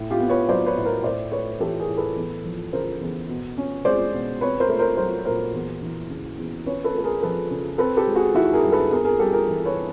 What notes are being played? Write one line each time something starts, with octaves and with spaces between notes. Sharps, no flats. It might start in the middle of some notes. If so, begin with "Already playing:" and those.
Already playing: A2
F4 G4
B3
B4 C#5
F#3 C5 D5
B4 C#5
A2
A#4 C5
A2 C5 D5
A3 B4 C#5
E3 G4 A4
G#4 A#4
A2
A4 B4
E2
F3
C#3 A#4 C5
E2
B2
C#4
G#3 C5 D5
B2
C4 B4 C#5
A#4 C5
A3
A#4 C5
F#3 A#4 C5
A#2 A#4 C5
E2
E3
C#3
E2
C#4 B4 C#5
A4 B4
A3 A4
G#4 A#4
F3 A4 B4
C#3
C4 A4 B4
G4 A4
G#3
F#4 G#4
D#3 E4 F#4
G#4 A#4
G2
A4 B4
B3 G#4 A#4
G#4 A#4
G3 G4 A4
G#4 A#4
E3
B4 C#5